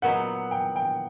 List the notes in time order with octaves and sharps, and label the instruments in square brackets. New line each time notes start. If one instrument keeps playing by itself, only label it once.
[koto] A#2 F#3 B3 D#4 [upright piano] F#5
[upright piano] G5
G5